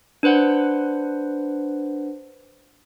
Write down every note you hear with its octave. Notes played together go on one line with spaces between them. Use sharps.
D4 B4 C5 F#5